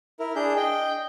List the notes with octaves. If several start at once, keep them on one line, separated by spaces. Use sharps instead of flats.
E4 A#4
D4 G#4 G6
D#5 G5